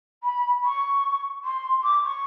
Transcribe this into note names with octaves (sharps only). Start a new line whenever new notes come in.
B5
C#6
C6
D6
C#6